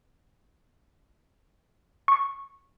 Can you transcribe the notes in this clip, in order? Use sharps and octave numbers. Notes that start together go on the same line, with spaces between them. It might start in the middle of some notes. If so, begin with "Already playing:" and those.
C#6